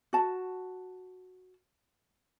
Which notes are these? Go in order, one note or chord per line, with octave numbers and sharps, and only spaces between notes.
F#4 A5